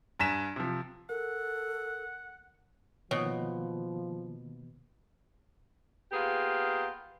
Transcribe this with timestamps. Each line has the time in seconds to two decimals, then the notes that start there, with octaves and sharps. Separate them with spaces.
0.20 G2 G#5 A#5 B6 E7
0.56 C3 F3
1.09 A4 A#4 F#5
3.11 B2 D#3 F3 A#3 C#5 D#5 D#6
6.12 A#3 B3 F4 G4 G#4